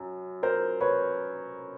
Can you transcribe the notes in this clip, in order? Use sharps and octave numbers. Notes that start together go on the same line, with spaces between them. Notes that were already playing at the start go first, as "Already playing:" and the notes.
Already playing: F#2
A#4 C5
B4 C#5